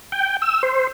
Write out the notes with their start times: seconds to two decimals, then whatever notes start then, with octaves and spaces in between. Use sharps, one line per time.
0.12 G5
0.42 E6
0.63 C5